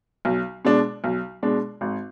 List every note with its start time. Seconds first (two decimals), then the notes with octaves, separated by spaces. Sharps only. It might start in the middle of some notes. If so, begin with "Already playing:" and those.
0.25 B1
0.65 B2 G#3 D4
1.04 B1
1.43 B2 G#3 D4
1.81 G#1